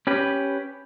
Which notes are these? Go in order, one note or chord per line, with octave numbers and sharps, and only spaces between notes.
C#4 G4 B4